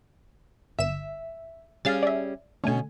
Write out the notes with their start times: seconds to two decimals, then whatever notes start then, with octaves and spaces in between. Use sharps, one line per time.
0.79 G1 E5 E7
1.85 G3 C#4 G#4 F5 F6 A6
2.03 D5 E5
2.64 B2 D3 A3 C#4 G#5